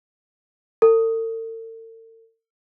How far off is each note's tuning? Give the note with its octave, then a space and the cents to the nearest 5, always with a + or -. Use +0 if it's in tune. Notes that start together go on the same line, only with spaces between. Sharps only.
A4 +45